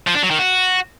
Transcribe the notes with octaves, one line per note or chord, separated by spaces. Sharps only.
F3
D4
F#3
D#3
F#4